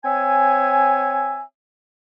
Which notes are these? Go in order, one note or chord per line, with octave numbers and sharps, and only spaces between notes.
C4 C#5 E5 G#5